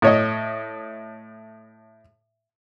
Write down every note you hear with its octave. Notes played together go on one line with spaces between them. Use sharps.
A2 C#5 D#5